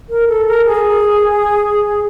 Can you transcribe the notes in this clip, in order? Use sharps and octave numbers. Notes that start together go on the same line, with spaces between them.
A#4
A4
A#4
G#4